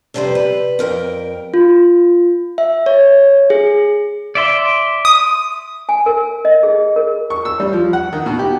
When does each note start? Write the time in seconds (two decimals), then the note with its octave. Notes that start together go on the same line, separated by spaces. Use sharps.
0.14 F2 C3 G3 C4 B4 C5
0.35 B4
0.79 F2 A#4 G5
1.54 F4
2.58 E5
2.86 C#5
3.50 G#4
4.35 D5 E5 C6
5.05 D#6
5.89 G#5
6.06 A#4
6.45 D#5
6.63 G#4
6.96 A#4
7.30 C#6
7.45 E6
7.60 G3
7.73 F3
7.93 F#5
8.13 D#3
8.26 B2
8.39 G4